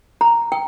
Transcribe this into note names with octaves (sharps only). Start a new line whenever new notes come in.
A#5
G5